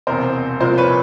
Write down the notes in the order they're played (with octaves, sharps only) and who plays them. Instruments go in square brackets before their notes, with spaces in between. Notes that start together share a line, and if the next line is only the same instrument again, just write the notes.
[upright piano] E1 E2 C3 A#4 C5
C2 A#2 F3 A#4 C5
B4 C#5